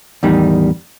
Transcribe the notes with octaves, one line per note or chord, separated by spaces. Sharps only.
E2 A2 D#3 G3 D#4